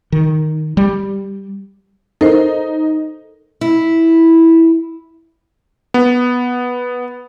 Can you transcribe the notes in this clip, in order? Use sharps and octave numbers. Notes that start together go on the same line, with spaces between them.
D#3
G3
D#4 A4 A#4 C5
E4
B3